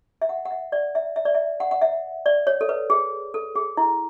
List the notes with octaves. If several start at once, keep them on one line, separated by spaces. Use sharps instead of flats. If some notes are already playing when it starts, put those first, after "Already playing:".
E5
F#5
F#5
E5
D5
E5
E5
D5
E5
F#5
F#5
E5
D5
C#5
A4
B4
G#4
A4
G#4
E4